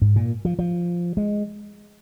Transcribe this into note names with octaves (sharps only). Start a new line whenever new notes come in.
G#2
A#2
F3
F3
G#3